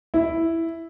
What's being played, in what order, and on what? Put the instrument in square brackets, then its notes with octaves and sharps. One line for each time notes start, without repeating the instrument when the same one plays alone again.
[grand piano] E4